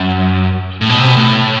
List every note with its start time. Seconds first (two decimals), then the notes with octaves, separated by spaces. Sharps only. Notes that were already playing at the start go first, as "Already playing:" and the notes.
Already playing: F#2
0.81 A2
0.89 B2
0.99 C3
1.08 B2
1.17 A2